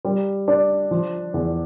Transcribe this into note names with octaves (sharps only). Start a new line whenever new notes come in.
G3
D4
F3
E2